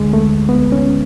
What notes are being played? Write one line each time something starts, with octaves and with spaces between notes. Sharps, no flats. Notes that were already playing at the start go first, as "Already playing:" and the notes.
Already playing: D2 D3 G#3
A3
B3
C#4